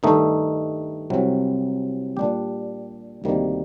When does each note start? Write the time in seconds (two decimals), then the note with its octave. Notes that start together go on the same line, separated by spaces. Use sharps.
0.03 G2 D#3 A3 D#4
1.10 C2 C3 F#3
2.17 A#2 G3 D4 G4
3.24 D2 C3 D#3 G3 A#3